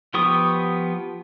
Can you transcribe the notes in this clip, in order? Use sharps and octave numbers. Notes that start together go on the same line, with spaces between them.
F3 B3 G4 C#6 D#6